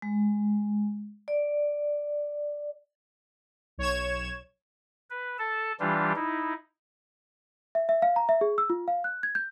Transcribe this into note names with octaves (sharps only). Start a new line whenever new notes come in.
G#3
D5
B1 C#5 C#6 G#6 E7
B4
A4 A5
E3 G3 D4 F4 G4
D#4 E4
E5
E5
F5
A#5
E5
G#4
E6
F4
F5
F#6
G#6
G6